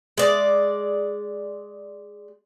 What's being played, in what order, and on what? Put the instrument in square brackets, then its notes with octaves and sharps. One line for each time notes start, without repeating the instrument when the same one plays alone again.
[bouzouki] G#3 D5